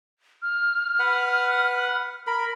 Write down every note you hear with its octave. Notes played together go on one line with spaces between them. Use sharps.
F6
B4 F#5
A#4 B5